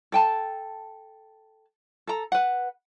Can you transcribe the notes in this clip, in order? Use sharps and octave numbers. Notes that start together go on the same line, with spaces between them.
A4 G5 A5
A4 A#5
B4 F#5